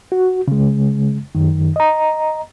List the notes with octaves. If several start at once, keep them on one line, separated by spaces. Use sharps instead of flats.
F#4
C#3 G#3
F#2 D#3
D#5 A#5